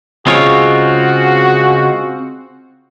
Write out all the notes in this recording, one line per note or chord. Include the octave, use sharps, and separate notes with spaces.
C#3 G#3 C4 F4 F#4 C#5